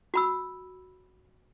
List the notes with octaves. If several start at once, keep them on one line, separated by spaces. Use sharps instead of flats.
F#4 B5 E6